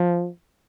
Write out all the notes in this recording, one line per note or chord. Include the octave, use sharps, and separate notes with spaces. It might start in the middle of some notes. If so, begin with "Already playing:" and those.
Already playing: F3